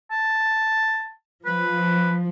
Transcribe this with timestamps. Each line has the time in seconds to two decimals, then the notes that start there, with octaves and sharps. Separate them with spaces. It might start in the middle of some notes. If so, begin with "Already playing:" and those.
0.11 A5
1.46 F3 B4